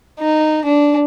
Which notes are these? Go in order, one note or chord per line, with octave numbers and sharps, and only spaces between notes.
D#4
D4